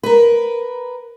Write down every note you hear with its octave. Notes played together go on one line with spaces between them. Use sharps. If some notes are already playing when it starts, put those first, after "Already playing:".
A#4 B4